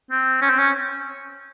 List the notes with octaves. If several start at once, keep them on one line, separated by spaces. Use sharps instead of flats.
C4
C#4
C4
C#4